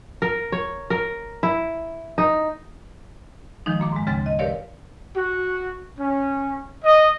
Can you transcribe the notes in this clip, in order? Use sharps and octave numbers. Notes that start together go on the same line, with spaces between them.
A#4
C#5
A#4
E4
D#4
D#3 F3 G#3 D#4
F#2 A#3 D6
G#2 G#3
D2 C#3 G#3 C4 G5 A6
D#5
G4 A#4 B4 C#5 D5 F5
F#4
C#4
D#5